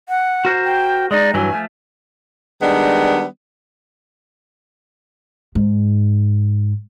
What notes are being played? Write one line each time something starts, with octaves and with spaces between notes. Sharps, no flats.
F#5
F#4 A#4 C5
G5
G#3 D#4 D5
G2 E3 F#3 G#5
F3 A3
D#3 G3 G#3 B3 D4
G#2